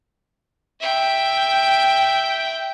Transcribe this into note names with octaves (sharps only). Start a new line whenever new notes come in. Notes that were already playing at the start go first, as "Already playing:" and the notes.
E5 G5